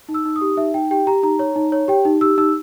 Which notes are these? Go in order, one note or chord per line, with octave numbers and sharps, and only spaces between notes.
D#4
E6
D#4
D#6
G4
D#4 E5
D#4 G5
G4 G5
G4 A#5
D#4 A#5
C#5
D#4
C#5
G4 G5
D#4
G4 E6
D#4 E6